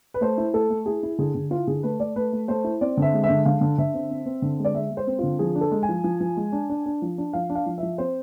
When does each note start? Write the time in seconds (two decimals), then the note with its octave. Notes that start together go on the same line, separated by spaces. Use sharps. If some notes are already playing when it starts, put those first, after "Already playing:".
0.14 B4
0.21 A3 C5
0.38 E4
0.53 A3 A4
0.70 A3
0.86 E4 G#4
1.03 E4
1.19 D3 G#4
1.35 D3
1.51 E4 F4
1.67 D3 G#4
1.83 A3 B4
2.00 A3 D5
2.16 A3 B4
2.33 A3
2.48 A3 C5
2.64 E4
2.81 C4 D5
2.97 D3 E5
3.13 G#3
3.24 E5
3.29 D3
3.45 D3 F5
3.61 D3
3.78 D3 E5
3.94 C4
4.11 C4
4.26 C4
4.42 D3
4.59 G#3
4.65 D5
4.74 G#3 E5
4.91 G#3
4.97 C5
5.07 C4
5.19 D3 F4
5.39 F3 G#4
5.55 D4
5.61 A4
5.71 G#3
5.83 G#5
5.89 F3
6.04 F3
6.21 F3
6.37 G#3
6.52 D4
6.70 D4
6.86 D4
7.02 F3
7.18 D4
7.33 F3 F5
7.50 D4
7.55 F5
7.66 F3
7.78 F3 E5
7.98 C4 C5